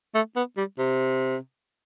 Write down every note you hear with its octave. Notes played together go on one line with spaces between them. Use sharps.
A3
B3
G3
C3